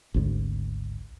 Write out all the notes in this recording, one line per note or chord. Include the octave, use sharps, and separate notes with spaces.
G#1 D2